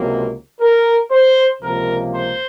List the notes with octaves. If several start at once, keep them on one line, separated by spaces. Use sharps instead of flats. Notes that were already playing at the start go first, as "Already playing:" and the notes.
Already playing: C#2 C3 F#3 A#3
A#4
C5
C#2 C3 F3 A#3 A#4
C5